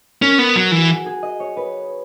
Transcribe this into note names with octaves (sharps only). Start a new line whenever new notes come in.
C#4 A#4
B3
F#3
E3
F#4
G#4
G#4
D#5
C#5
B4